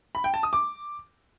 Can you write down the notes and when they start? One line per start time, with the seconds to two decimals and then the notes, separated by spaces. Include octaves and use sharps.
0.15 B5
0.24 G5
0.34 A5
0.43 D#6
0.53 D6